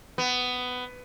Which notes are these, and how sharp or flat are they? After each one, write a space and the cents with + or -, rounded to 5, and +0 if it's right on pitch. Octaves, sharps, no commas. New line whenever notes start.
B3 +15